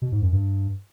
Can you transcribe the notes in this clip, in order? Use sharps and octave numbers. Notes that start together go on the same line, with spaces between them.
B2
G#2
F#2
G2